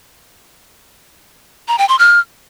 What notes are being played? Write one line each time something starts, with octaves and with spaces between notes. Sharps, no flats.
A#5
G5
C6
F6